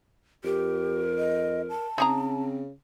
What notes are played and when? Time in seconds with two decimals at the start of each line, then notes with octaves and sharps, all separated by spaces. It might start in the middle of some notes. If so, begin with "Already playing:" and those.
0.44 F2 G4 A#4
1.18 D#5
1.70 A5
1.98 C#3 C4 D#4 G#4 A#5